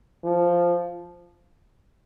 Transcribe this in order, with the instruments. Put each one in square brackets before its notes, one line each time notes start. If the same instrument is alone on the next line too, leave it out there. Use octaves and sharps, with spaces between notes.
[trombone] F3